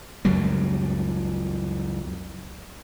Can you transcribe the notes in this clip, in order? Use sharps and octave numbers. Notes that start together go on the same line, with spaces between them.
C#2 F#2 F#3 G3